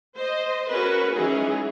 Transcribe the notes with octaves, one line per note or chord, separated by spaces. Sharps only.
C5 D#5
C#4 F#4 G#4 A#4 B4
E3 F#3 G#3 C#4 D#4 G#4